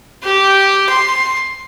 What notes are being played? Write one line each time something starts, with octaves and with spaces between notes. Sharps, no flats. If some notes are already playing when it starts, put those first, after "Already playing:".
G4
C6